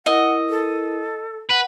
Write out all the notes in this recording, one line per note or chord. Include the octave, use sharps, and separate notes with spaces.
E4 A#4 D#5 F#5
A4
B4 F#5